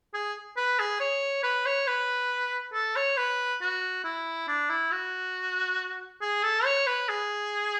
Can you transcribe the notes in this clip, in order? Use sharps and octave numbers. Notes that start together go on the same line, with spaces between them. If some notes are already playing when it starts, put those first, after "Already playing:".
G#4
B4
G#4
C#5
B4
C#5
B4
A4
C#5
B4
F#4
E4
D4
E4
F#4
G#4
A4
C#5
B4
G#4